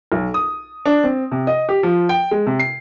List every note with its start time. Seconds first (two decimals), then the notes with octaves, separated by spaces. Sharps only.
0.12 B1
0.34 D#6
0.85 D4
1.04 C4
1.32 C3
1.47 D#5
1.69 G4
1.83 F3
2.09 G5
2.31 G#3
2.46 C3
2.59 C7